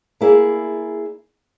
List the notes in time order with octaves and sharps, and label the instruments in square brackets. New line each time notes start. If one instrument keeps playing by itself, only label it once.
[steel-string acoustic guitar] A#3 E4 G#4 D5